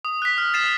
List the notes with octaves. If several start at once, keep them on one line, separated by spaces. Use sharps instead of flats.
D#6
F#6 B6
F6
A6 C7 E7